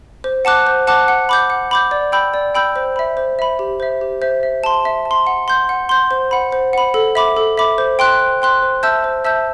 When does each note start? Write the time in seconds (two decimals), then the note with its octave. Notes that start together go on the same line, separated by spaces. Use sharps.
0.24 C5
0.45 F#5 A5 D6 F#6
0.67 C5
0.87 F#5 A5 D6 F#6
1.08 F#5
1.29 B5 D6 G6
1.50 F#5
1.71 B5 D6 G6
1.91 D5
2.12 G5 B5 E6 G6
2.34 D5
2.55 G5 B5 E6 G6
2.76 C5
2.96 E5 B5
3.17 C5
3.39 E5 B5
3.59 G4
3.80 C5 E5
4.01 G4
4.22 C5 E5
4.43 E5
4.64 A5 C6
4.85 E5
5.05 A5
5.11 C6
5.27 F#5
5.48 C6 G6
5.69 F#5
5.89 C6 G6
6.11 C5
6.31 F#5 B5
6.52 C5
6.73 F#5 B5
6.94 A4
7.15 E5 B5 D6
7.37 A4
7.58 E5 B5 D6
7.78 C5
7.99 G5 C6 F#6
8.20 C5
8.42 G5 C6 F#6
8.62 C5
8.83 E5 A5 E6 G6
9.04 C5
9.25 E5 A5 E6 G6